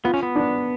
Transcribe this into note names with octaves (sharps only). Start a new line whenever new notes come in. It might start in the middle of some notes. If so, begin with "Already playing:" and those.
B3 F4
C#4
B3
D4